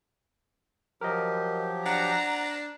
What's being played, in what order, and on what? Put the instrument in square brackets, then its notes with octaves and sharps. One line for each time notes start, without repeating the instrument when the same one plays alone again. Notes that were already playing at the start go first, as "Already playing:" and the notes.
[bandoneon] F3 F#3 G4 [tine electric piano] A#4 D#5
[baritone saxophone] D4 [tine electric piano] F#5 [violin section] A#5